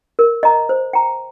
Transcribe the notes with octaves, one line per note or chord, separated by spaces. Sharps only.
A#4
D#5 A#5
C5
G5 A#5